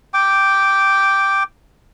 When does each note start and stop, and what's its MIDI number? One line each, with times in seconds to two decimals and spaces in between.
0.14 1.43 79
0.14 1.43 86